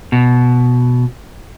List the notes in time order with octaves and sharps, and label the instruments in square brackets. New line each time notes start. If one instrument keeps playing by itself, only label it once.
[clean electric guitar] B2